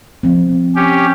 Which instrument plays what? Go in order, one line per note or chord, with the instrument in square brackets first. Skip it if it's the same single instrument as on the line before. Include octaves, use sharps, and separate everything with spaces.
[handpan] F3 C4
[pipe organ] C#4 G4